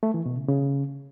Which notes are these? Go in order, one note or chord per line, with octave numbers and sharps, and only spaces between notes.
A3
E3
B2
C#3
C#3